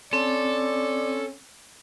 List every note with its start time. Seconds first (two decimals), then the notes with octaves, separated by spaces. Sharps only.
0.13 C4 C#4 A4 D5